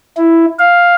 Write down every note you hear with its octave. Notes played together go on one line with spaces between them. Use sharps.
E4
F5